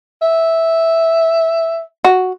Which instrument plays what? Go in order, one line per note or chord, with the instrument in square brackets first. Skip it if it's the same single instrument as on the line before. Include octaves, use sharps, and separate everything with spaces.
[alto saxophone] E5
[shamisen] F#4